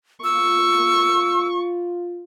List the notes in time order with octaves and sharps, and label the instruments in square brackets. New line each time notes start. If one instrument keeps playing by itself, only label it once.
[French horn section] F4 [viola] C#6 [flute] E6